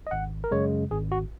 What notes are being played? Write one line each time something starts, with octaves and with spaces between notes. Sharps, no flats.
D#5
G#1 F#5
A#4
F#2 C#3 G#3 C#5
G#1 G#4
F#4